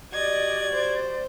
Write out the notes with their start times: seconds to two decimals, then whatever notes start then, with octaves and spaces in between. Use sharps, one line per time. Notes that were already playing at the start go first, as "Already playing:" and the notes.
0.13 F#4 G4 D5 D#5 G#6
0.73 C5